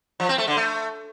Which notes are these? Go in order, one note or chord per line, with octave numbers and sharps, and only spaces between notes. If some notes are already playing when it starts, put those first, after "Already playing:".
F3
C4
A3
D3
A3